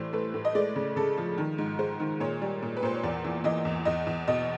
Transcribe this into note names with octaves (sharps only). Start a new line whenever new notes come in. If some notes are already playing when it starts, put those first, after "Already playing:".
Already playing: A2 E3 G3 C5
A3 B4
A2
D#5
G#3 D5
C#3
C#3 A4
F3
D#3
G#2
G#3 C5
D#3
A#2 C#5
G3
A#2
B4
A#2 C5
C#5
E2 D5
E3
E3 D#5
E2
E2 D#5
E2
B2 D#5